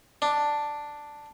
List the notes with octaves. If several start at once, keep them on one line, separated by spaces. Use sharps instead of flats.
D4